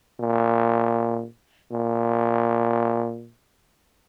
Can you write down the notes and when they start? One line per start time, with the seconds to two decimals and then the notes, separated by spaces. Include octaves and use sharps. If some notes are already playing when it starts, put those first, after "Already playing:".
0.20 A#2
1.71 A#2